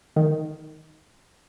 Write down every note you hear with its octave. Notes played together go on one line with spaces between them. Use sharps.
D#3